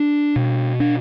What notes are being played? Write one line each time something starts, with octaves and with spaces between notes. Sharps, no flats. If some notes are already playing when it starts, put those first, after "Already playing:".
Already playing: D4
B2
D4